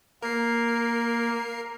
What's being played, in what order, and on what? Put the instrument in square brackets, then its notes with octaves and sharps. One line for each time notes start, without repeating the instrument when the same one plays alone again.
[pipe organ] A#3 [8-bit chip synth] A#4 C7